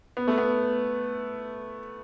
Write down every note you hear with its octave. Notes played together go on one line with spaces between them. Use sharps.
B3
A3
B3